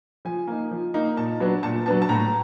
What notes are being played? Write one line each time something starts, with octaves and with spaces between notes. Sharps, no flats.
F3 G#5
A#3 D#4
F3
A#3 D#4
A#2 A5
F#3 B3 D4
A#2 A5
F#3 B3 D4 A5
A5
A2 A#5